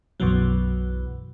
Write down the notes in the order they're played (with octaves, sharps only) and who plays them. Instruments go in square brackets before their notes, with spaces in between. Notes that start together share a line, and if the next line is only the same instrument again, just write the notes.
[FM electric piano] B1 F#2 B2 E3 F#3